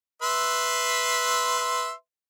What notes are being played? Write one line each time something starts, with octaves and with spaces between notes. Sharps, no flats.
B4 E5 C6